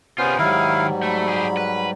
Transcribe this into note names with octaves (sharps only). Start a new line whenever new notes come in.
C3 B3 C#4 F4 G#4 C5
G#2 D#3 F#3 G3 E4 F5
A3 B5
G4 G#4
B4